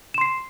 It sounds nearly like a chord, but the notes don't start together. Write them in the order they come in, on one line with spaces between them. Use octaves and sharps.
E7 C6 C7